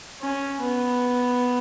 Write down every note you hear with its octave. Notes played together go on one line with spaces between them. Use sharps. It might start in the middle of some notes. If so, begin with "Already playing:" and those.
C#4
B3